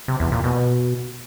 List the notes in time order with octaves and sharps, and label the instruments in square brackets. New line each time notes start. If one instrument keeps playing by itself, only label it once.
[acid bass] C3
E2
A#2
B2